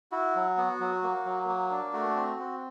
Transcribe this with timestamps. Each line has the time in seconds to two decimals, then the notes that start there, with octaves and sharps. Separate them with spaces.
0.12 E4 F#4
0.36 F#3
0.57 B3
0.80 F#3
1.03 A#3
1.26 F#3
1.48 A#3
1.71 D4
1.93 A3 F#4
2.16 C4
2.39 C4